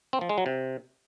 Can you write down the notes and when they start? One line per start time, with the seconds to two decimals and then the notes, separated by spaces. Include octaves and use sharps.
0.13 C4
0.21 F3
0.29 G#3
0.38 F#3
0.46 C3